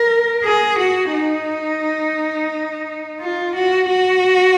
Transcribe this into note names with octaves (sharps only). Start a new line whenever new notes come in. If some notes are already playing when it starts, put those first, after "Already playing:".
Already playing: A#4
G#4
F#4
D#4
F4
F#4
F#4